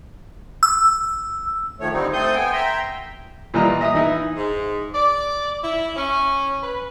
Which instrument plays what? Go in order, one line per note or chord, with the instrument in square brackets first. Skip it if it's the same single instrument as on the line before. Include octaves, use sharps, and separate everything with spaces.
[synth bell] E6
[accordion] D#3 F3 A3 C#5
D3 G3 C4 D#4
A3 C4 A4 C6 D#6 G6
B3 G5 G#5
E5 G5 A#5 C6
[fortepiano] A#2 E3 G3 F4 D#5 A#5
D#5 E5 A#5 D#6
E3 D#4 E4
[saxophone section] G#2
D5
E4
C#4
B4